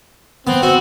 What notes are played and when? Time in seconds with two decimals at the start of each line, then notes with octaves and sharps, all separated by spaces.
0.47 B3 C4
0.62 C4 F#4